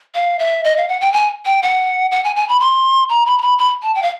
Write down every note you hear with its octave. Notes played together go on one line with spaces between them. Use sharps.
F5
E5
D#5
F5
F#5
G5
G#5
G5
F#5
F#5
G#5
G#5
B5
C6
A#5
B5
A#5
B5
B5
A5
G5
F5